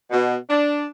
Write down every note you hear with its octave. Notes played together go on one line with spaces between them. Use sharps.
B2
D4